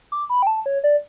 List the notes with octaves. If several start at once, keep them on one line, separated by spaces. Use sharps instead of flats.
D6
B5
G5
A5
C#5
D5